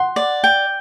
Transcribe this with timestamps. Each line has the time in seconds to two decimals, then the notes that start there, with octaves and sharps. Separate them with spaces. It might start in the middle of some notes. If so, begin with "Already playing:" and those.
Already playing: F#5 C6
0.16 D5
0.44 G5